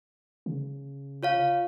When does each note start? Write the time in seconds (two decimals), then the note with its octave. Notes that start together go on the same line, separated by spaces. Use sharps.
0.46 C#3
1.23 F4 C#5 F5